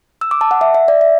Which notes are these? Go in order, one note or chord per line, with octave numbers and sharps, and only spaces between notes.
E6
D6
A5
F#5
E5
E5
D5
E5